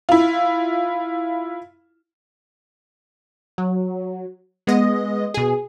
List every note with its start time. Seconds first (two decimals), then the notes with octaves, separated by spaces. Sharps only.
0.09 E4 F4
3.58 F#3
4.67 G#3 B3 D#5
5.34 B2 G#4